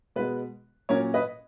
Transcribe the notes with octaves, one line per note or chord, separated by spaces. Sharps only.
B2 G#3 B3 B4
A#2 F#3 C#4 A#4 C#5
B4 D#5